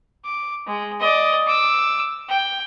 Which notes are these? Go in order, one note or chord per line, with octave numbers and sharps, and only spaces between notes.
D6
G#3
D5 D#5
D6 E6
G5